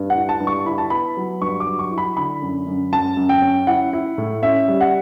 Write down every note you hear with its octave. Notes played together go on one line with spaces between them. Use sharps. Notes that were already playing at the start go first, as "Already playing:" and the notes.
Already playing: G2
F#5
E4
A5
G2
C#6
E4 B5
A5
B3 B5
F#3
G2 C#6
D6
F#3
C#6
E4
B5
D3 B5
F#2
F#2
F#2 A5
F#2
G5
C#4
E4 F#5
E4
A2
C#4 E5
G3
F#5